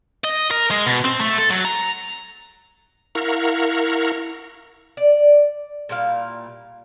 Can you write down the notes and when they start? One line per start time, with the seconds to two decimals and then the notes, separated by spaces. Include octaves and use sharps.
0.24 D#5
0.51 A#4
0.71 G#3
0.86 B2
1.04 C4
1.21 A3
1.38 A4
1.50 F#3
1.65 A#5
3.15 E4 A#4 F5 F#5 A#5 C#6
4.97 D5
5.89 A#2 G3 E4 F5